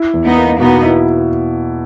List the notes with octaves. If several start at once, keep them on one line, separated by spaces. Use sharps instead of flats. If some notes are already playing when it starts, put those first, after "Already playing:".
Already playing: E4
E2
B3 D#4
A#3
B2 B3 D#4
E4